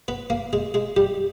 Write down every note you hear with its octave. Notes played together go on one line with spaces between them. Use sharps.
B3 B4
A#3 A#4
G#3 G#4
G#3 G#4
G3 G4